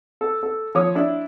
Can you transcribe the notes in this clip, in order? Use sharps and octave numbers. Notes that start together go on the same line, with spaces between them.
A4
A4
F3 C#5 D#6
D4 E4